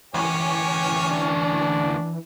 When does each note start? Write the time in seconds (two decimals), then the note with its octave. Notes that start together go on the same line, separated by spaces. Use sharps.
0.14 D2 E3 C#4 G4 C#5 G#5
1.11 D4